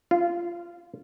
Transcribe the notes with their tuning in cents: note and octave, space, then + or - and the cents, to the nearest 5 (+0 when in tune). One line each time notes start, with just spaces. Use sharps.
F4 -15